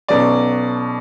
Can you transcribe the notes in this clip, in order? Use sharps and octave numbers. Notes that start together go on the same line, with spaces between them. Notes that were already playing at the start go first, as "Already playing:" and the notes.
B1 B2 F#3 C#4 D5